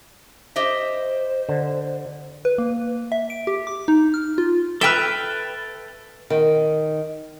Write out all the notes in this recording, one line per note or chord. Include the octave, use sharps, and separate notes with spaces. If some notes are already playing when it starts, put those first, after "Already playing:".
G4 C5 D#5 E5
D3
B4
A#3
E5
D7
G4
D6
D#4
F6
F4
A4 B4 E5 G5 F6
D#3